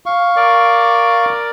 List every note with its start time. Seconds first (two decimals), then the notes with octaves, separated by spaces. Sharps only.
0.06 F5 C#6
0.36 A#4 D5 D6